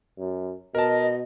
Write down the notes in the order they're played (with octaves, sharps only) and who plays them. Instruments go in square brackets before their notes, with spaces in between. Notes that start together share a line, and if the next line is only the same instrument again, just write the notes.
[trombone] F#2
[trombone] B2 [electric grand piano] A#4 A5 [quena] D#5